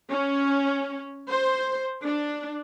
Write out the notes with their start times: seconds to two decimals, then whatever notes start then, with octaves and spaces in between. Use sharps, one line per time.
0.10 C#4
1.29 C5
2.03 D4